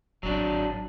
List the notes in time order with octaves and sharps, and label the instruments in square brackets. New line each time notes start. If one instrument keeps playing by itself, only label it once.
[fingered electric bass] G#1 [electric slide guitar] F#3 D4